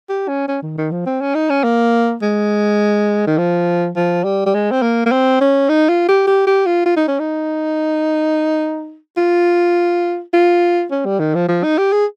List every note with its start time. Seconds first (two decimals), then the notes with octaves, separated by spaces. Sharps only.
0.09 G4
0.28 C#4
0.48 C#4
0.62 D#3
0.78 D#3
0.92 F3
1.06 C4
1.21 C#4
1.35 D#4
1.50 C#4
1.64 A#3
2.22 G#3
3.27 D#3
3.38 F3
3.96 F3
4.24 G3
4.46 G3
4.54 G#3
4.71 C4
4.82 A#3
5.06 A#3
5.12 C4
5.41 C#4
5.69 D#4
5.89 F4
6.09 G4
6.27 G4
6.47 G4
6.66 F4
6.86 F4
6.97 D#4
7.08 C#4
7.19 D#4
9.17 F4
10.34 F4
10.91 C#4
11.06 G3
11.20 D#3
11.35 F3
11.48 F3
11.64 D#4
11.78 G4
11.92 G#4